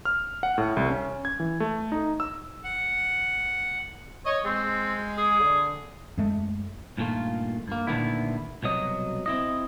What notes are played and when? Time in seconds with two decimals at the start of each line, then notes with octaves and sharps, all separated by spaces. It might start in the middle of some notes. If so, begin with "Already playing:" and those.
0.05 F6
0.43 F#5
0.58 A2
0.77 C2
0.90 C#4
1.25 G#6
1.40 E3
1.60 A3
1.92 D#4
2.20 E6
2.64 F#5
4.26 C#5 D#5
4.45 G#3 C4
5.18 G#4
5.40 D3
6.17 F#2 G#3 A3
6.97 G2 A#2 D#3 A3 F4
7.68 G2 A#3
7.87 A#2 D3 D#3 A3 B3 E4
8.63 C2 B2 F#3 D#5
9.26 C4 E4 D#5